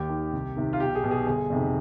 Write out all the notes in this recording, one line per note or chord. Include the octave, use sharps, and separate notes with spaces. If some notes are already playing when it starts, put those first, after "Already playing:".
Already playing: D#2 G4
D#3
C2
C3 D#3
F4
B1 G4
G#4
B2
G#4
G1 G#4
F2 C3 D#3